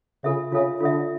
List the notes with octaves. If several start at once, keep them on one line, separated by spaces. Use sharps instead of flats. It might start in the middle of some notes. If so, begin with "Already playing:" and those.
C#3 F4 A4 E5
C#3 F4 A4 E5
D3 F4 A4 E5